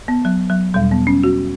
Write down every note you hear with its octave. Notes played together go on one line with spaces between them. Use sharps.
B3
F#3
F#3
E2 B2 G3
B3
C#4
F#4